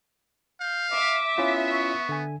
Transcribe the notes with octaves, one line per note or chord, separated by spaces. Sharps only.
F5 G6
E5 D6
B3 C#4 E4 F4
C#6
D3 G#5